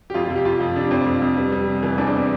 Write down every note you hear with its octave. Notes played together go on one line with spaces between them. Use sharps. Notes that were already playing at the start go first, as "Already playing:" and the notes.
G4
F2 F4
F4
C3
G4
F2 F4
F2
C3 D4
F2 C4
F2
F2
G3 B3
G3
C3
E3
E2 D4
C4
B3